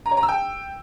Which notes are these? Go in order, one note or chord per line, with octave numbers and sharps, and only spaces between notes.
A#5
C#5
A#5
E6
G5